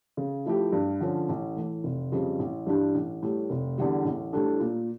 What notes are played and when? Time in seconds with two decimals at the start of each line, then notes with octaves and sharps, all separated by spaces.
0.17 C#3
0.46 F3 A3 E4 G4
0.72 G2
1.01 D3 F3 C#4
1.29 A1
1.57 A2 E3
1.84 F1
2.12 F2 C#3 G3
2.39 A1
2.66 G2 E3 G3 D4
2.94 A1
3.23 A2 G3
3.50 F1
3.78 E2 D3 G3
4.05 A1
4.33 A2 G3 D4 A4
4.60 A#2